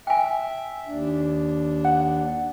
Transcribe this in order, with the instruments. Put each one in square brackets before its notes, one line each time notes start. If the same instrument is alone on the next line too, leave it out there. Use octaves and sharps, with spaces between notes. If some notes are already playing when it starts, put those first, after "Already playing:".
[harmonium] E5 [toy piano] G5 G#5
[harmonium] D#2 D4
[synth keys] F#5